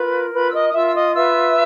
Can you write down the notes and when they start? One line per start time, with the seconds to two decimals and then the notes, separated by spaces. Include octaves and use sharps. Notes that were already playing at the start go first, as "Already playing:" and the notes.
Already playing: F4 A#4 B4 B5
0.34 F4 B4 B5
0.50 E6
0.54 D#5 D#6
0.69 D#6
0.74 F4 E5 E6
0.86 E6
0.95 D#5 D#6
1.15 B4 E5 E6